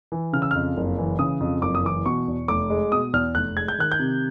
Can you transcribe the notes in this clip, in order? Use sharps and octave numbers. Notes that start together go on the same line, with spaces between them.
E3
C#3 F6
E6
F2 F6
F#1
E3
C#3 D#6
F2
F#1 D6
D#6
E3 D6
B2 C#6
E2
F1 D6
G#3
B2 D#6
E2 F6
F1 F#6
G#3 G#6
G6
D#3 F#6
G6
C3